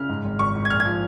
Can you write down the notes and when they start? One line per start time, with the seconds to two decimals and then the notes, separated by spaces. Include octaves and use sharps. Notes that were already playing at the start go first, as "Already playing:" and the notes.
Already playing: C#3 F6
0.09 G#2
0.24 G#1
0.39 G#1 C#6
0.56 G#2
0.65 G#6
0.70 A#1 F6
0.80 G#6
0.85 F3